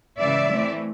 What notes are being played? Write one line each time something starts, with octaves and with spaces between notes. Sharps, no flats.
C#3 E3 G#3 D5 E5
E3 A3 C4